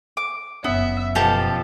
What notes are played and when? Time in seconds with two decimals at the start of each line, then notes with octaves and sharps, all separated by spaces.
0.17 D6
0.64 F#1 B3 C#4 E5
1.15 B2 F3 G4 A4 A5 A#5